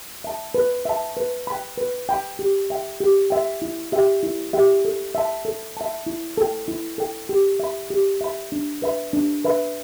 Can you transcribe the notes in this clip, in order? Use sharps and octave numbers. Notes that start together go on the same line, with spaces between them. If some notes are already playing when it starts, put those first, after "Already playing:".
E5 A5
B4
E5 A5
B4
G5 B5
B4
G5 B5
G4
E5 G5
G4
E5 G5
E4
G4 E5 G5
E4
G4 E5 G5
A4
E5 A5
A4
E5 A5
E4
A4 G5
E4
A4 G5
G4
E5 B5
G4
E5 B5
D4
B4 E5 B5
D4
B4 E5 B5